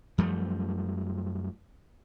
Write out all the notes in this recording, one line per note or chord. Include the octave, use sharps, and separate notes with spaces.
F#2 F3 G3 A3